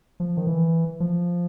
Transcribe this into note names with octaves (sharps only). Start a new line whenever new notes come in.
F3
D#3
E3
F3